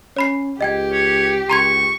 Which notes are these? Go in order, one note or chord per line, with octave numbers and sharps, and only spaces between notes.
C#4 C#5 B5 C7
C#2 G4 D#5 G5 G#6
C#5
C#2 A#5 C6 C#6 G#6